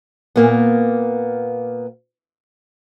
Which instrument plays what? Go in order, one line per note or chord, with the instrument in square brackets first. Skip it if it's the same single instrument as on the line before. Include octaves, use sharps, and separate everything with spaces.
[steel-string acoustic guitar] A#2 A#3 B3